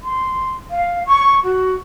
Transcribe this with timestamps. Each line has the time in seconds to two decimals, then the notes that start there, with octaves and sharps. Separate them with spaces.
0.03 C6
0.71 F5
1.07 C#6
1.44 F#4